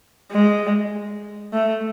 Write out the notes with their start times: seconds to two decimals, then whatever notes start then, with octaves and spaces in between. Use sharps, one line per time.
0.32 G#3
1.53 A3